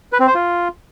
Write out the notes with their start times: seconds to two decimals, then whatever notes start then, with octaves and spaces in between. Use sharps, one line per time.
0.13 B4
0.20 C4
0.27 C5
0.34 F4